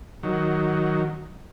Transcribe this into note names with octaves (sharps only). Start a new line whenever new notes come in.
D#3 F#3